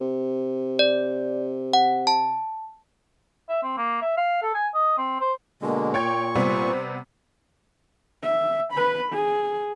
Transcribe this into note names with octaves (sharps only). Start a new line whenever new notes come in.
C3
D5
F#5
A5
E5
C4
A#3
E5
F5
A4
G#5
D#5
C4
C5
B2 D3 G#3 A#3
A#2 C#5 G5 C#6 G#6
C3 G3 B3 C5
E5
B4 B5
G#4